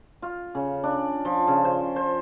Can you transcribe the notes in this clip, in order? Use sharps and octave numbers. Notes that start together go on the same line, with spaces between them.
F4
C#3
D4
F3
C#3
C5
C5